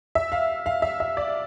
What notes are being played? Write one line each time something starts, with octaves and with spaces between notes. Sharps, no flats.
E5
F5
F5
E5
E5
D5